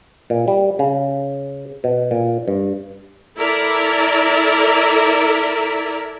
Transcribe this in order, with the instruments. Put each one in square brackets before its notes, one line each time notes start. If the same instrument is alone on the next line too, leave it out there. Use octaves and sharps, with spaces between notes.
[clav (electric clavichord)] A#2
G3
C#3
B2
A#2
G2
[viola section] E4 A4 A#4 D5 E5